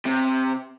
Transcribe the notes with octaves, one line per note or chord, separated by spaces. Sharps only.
C3